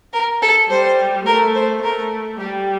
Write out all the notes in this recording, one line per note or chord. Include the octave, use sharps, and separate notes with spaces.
A#4
A4
G3 C5
A3 A#4
C5
A3 A#4
G3 G4